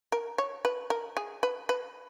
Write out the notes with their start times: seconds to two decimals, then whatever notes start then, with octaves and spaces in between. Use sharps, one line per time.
0.12 A#4
0.38 C#5
0.65 B4
0.90 A#4
1.17 G#4
1.43 B4
1.69 B4